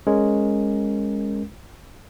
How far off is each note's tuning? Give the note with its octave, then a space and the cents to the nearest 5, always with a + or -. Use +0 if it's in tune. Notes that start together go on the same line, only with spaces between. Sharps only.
G#3 +0 C#4 +0 A#4 +0